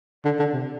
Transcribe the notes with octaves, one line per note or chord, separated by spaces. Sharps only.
D3
D3
C3